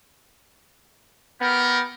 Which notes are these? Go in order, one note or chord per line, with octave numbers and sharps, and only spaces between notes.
B3 G4 A#4